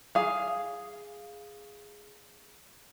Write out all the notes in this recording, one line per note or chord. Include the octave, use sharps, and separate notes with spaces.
G#4 F5